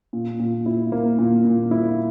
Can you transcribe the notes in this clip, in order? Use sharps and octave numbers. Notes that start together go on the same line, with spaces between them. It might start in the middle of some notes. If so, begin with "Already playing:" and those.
A#2
A#2
E4
A#3
A#2
A#2
E4